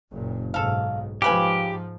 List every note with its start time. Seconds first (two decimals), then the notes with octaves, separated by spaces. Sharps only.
0.13 F#1 A#2
0.54 B1 G#2 A4 F5
1.22 G#2 C#3 F3 G4 B4 G#5